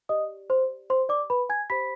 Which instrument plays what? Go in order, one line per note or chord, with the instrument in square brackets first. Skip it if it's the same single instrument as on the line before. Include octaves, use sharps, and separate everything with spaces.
[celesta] G4 D5 D#5 D#6
C5 C6
C5 C6
D5 D6
B4 B5
G#5 G#6
G4 C5 B5 B6